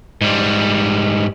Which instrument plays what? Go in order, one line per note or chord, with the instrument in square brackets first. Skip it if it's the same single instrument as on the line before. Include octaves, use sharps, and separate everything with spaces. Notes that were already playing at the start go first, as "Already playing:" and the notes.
[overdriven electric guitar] G#2 G3